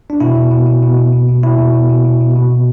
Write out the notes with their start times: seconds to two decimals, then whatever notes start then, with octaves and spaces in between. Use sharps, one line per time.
0.10 D4
0.20 B2 E4
0.36 B2
0.51 B2
0.67 B2
0.83 B2
0.97 B2
1.13 B2
1.28 B2
1.43 B2 E4
1.59 B2
1.74 B2
1.89 B2
2.05 B2
2.20 B2
2.35 B2
2.51 B2